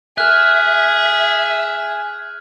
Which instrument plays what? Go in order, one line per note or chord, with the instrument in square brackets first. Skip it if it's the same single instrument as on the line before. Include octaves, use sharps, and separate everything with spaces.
[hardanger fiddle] G#4 [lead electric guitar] E5 [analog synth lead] G#5 [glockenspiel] F6 F#6